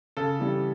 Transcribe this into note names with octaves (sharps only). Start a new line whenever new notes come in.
C#3 A4
E3 G3